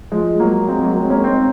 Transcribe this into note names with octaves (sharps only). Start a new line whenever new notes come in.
F3 G#3
F#3 A#3
G#3 C4
F#3 A#3
G#3 C4
A#3 C#4
C4 D#4